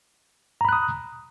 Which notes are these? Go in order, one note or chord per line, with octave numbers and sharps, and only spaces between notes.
A#5 B5 D#6 F#6